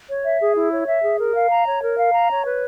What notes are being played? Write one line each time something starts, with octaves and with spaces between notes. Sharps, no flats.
C#5
E5
G#4
E4
C#5
E5
G#4
A#4
F5
A#5
C#5
A#4
F5
A#5
C#5
B4